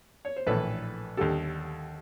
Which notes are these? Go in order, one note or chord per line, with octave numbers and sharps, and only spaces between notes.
C#5
C5
A#1 A2 E3 A4 B4
D#2 D3 G3 G4 A4